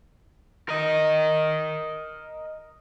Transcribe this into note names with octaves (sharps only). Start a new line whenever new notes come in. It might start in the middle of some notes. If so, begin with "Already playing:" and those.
A#4 D#5